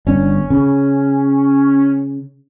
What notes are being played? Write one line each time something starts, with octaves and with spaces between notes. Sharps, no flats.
G1 C#4 D4
C#3